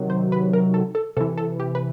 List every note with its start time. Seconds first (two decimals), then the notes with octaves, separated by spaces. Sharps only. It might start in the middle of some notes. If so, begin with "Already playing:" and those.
Already playing: C3 D#3 F#3
0.10 C5
0.32 B4
0.53 A#4
0.74 A4
0.95 A4
1.17 C3 E3 A4
1.38 A4
1.60 G4
1.75 B4